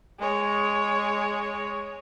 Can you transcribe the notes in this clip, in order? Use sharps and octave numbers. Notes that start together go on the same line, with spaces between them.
G#3 C#5